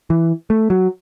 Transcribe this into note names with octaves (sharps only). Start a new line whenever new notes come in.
E3
A3
F#3